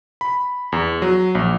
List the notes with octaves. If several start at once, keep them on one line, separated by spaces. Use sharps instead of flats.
B5
E2
F#3
A#1